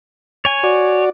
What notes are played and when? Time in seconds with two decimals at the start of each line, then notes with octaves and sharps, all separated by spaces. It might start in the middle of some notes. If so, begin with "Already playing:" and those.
0.45 C#5 G#5
0.64 F#4 D5